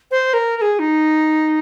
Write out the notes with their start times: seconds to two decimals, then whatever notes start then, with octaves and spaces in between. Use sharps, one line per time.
0.11 C5
0.34 A#4
0.57 A#4
0.62 G#4
0.79 D#4